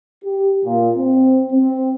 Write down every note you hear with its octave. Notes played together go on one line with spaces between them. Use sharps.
G4
A#2
C4
C4